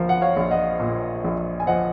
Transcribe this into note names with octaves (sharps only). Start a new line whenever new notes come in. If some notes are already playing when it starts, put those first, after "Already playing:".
Already playing: A#1 F3 A#4
F#5
C#5 F5
A#1
D#5 F#5
A#2
A#1
G#5
F3 D#5 F#5